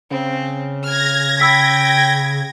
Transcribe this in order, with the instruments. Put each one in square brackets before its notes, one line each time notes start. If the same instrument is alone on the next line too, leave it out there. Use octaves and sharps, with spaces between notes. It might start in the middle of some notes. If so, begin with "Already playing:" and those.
[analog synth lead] C#3 [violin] C4
[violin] F6 [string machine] G#6 A#6
[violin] G5 [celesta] B5 E6 B6